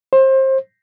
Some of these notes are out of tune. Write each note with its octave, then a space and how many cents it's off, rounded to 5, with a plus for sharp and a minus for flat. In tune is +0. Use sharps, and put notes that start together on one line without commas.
C5 +25